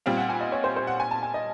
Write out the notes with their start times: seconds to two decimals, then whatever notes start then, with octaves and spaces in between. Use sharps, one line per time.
0.06 A#2 G3 C4 F5
0.17 F#5
0.29 G#5
0.41 D#5
0.52 C#5
0.64 C5
0.76 C5
0.87 F#5
1.00 G#5
1.11 A5
1.23 G#5
1.34 D#5